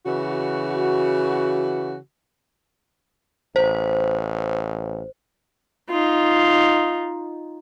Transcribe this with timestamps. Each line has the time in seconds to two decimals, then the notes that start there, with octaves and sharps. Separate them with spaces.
0.06 C#3 E3 F#4
3.56 A1 C5
5.89 D#4 F4